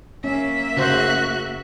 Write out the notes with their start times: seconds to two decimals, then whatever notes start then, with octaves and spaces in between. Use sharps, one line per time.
0.24 A#3 C#4 E5
0.77 C#3 F#4 C5 F#6